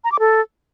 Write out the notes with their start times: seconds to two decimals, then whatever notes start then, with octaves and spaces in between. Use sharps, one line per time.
0.04 A#5
0.12 D6
0.19 A4